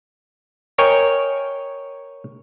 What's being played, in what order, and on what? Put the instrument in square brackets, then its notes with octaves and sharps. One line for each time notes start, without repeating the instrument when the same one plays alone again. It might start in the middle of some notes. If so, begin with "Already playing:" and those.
[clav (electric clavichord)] A#4 C#5 D#5 G5 G#5